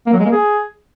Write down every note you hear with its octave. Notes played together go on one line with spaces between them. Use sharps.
A#3
F#3
G#3
A#3
G#4